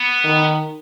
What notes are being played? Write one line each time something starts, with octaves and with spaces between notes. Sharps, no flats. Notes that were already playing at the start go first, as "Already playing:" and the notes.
Already playing: B3
D#3